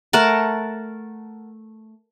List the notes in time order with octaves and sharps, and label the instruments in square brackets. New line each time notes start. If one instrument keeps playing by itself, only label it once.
[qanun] A3 A#4 F#5 A5